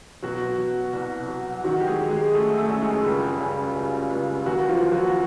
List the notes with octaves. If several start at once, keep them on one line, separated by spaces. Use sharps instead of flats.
B2 F#3 F#4
F#3
C2
F#3
D#3 F#3 F#4
G4
G#3 G#4
F#3
G#3 G#4
F#2 A3 A4
A3 A4
F#2
G#3 G#4
C#2 G3 G4
C#3
C#3
C#2
D#2 F#3 F#4
F3 F4
D#2
F#3 F#4